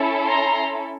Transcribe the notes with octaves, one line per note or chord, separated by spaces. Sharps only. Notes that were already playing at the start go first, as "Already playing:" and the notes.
Already playing: C#4 E4 A4
A#5 C6